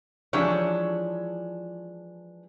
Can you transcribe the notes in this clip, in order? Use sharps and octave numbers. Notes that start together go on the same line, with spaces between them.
E3 F3 G#3 D4 G4 C#5